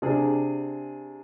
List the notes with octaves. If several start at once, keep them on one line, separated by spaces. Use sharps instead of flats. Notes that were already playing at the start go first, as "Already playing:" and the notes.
C3 D4 G#4